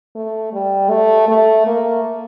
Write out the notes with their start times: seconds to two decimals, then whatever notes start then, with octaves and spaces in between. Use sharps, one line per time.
0.15 A3
0.53 G3
0.90 A3
1.28 A3
1.66 A#3